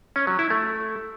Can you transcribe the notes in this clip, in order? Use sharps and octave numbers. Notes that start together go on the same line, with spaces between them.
C#4
F#3
E4
A3